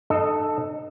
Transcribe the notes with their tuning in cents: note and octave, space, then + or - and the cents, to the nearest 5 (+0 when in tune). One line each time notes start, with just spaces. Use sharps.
D#4 -45 A4 +5 D#5 +0